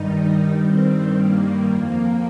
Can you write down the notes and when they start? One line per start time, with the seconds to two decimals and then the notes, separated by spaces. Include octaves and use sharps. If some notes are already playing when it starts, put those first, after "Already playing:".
Already playing: G2 D#3 G3 D#4
0.63 C4
1.15 A#3
1.68 F2 F3